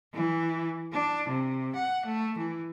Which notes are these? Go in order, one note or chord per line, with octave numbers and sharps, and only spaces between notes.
E3
D4
C3
F#5
A3
E3